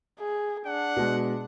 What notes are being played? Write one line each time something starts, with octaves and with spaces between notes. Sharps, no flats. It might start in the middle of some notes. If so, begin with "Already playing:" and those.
G#4
D4 F#5
B2 G#3